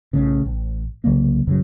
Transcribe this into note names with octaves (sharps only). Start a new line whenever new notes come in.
B1 A2 C#3
A1
C2 C#3 F#3 A#3
A1 F#2 C#3 F#3